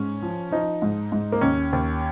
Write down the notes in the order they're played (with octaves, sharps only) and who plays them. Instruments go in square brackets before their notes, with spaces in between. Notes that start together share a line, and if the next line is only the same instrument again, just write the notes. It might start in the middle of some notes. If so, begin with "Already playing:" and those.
Already playing: [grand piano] G#2 C#4
F3
F3 D#4
G#2
G#2
A#3
D#2 C#4
D#2